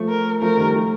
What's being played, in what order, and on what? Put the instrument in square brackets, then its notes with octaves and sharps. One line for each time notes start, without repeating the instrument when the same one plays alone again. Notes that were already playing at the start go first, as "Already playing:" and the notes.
Already playing: [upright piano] F3 A3
[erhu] A#4
[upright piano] F3 A3 [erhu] A#4
[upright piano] D#3 G3
F3 A3